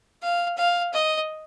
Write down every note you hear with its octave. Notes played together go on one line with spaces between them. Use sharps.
F5
F5
D#5